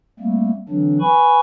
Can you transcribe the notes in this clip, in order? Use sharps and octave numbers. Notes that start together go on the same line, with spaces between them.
G3 A3 A#3 C4
D3 E3 F#3 C4 D4
B4 G#5 B5 C#6